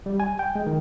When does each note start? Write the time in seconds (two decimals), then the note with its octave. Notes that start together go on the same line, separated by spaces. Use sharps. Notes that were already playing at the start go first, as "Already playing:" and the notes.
0.06 G3
0.20 G#5
0.39 G5
0.55 G#3
0.66 D#3